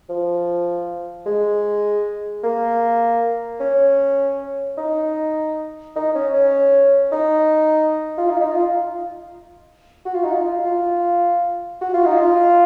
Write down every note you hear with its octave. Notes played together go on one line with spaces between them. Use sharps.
F3
G#3
A#3
C#4
D#4
D#4
C#4
C#4
D#4
F4
D#4
D#4
F4
F#4
F4
D#4
F4
F4
F#4
F4
D#4
F4